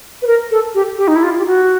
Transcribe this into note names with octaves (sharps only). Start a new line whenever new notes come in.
B4
A#4
A4
G4
G4
D#4
E4
F4
G4
F#4